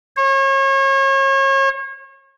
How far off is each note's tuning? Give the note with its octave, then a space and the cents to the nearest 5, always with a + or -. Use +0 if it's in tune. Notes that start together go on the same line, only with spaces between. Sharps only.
C#5 -35